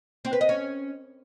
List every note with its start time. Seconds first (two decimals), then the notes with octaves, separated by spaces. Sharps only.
0.25 C4
0.33 B4
0.41 D#5
0.49 C#4